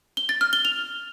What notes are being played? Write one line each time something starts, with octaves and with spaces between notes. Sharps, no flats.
G7
A6
F6
G7
F7